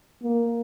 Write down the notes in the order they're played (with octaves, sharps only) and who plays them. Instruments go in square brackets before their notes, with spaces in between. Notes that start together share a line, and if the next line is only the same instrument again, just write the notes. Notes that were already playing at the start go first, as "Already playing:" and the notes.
[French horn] A#3